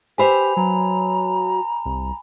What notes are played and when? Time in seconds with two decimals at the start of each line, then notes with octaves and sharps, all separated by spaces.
0.18 G4 B4 C5 E5 G#5 B5 F7
0.57 F#3 A#5
1.85 C2